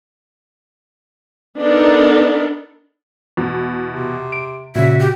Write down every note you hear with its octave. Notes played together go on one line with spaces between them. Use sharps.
B3 D4 D#4 A4 A#4
E2 B2
C3
D7
A#2 C#3 F#4 E5
G4